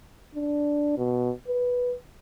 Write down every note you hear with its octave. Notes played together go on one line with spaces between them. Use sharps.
D4
B2
B4